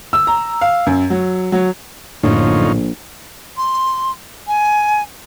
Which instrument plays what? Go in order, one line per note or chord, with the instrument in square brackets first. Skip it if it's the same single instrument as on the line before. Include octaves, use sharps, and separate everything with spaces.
[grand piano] E6
A#5
F5
F#2
F#3
F#3
[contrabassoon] A#1 [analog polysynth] F#2 D3 [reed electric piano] A2 [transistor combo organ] C#4 D#4 F4
[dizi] C6
G#5